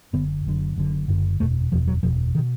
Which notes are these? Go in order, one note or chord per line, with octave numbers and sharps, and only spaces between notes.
F#1 F#2 D3 B3
F#1 F#2 D3
F#1 F#2 D3
F#1 F#2 D3
F#1 E2 B2 A3
F#1 E2 B2 F3
F#3
F#1 E2 B2 F3
D#3
B2